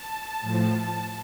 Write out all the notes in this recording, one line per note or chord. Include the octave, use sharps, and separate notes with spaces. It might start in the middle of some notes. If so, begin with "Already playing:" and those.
Already playing: A5
A2 F3
A5